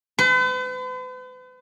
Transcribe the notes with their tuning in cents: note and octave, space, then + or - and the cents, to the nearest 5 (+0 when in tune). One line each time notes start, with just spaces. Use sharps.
B4 +45